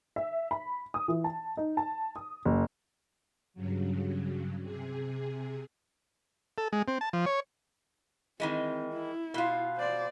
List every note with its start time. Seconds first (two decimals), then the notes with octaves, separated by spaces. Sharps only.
0.16 E5
0.51 B5
0.94 D#6
1.08 E3
1.24 A5
1.57 D#4
1.77 A5
2.16 D#6
2.45 F#1
3.54 G2 C#3 F#3
4.61 C3 G#4
6.58 A4
6.73 G#3
6.88 C4
7.01 A5
7.13 F3
7.26 C#5
8.40 D#3 E3 G#3 C4
8.93 E4
9.34 B2 F4
9.76 C5 D5